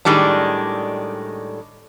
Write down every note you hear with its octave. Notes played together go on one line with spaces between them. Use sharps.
A2 D#3 G3 G#3 D4